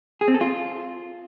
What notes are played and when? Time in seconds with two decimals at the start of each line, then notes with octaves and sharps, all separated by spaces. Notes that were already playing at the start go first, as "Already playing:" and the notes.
0.21 G#4
0.28 C4
0.34 A4
0.41 F4